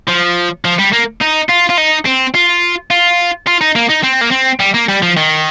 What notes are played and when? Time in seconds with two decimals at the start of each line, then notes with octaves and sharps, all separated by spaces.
0.08 F3
0.65 F3
0.79 G3
0.92 A#3
1.21 D#4
1.49 F4
1.69 F4
1.77 D#4
2.05 C4
2.34 F4
2.90 F4
3.47 F4
3.61 D#4
3.76 A#3
3.90 D#4
4.04 C4
4.21 A#3
4.31 C4
4.60 G3
4.74 A#3
4.89 G3
5.03 F3
5.17 D#3